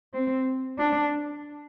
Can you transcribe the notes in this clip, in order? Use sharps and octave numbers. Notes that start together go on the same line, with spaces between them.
C4
D4